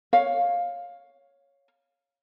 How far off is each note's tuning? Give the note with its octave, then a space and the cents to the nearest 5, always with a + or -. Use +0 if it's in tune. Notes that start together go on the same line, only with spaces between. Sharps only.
C#5 +0 F5 +10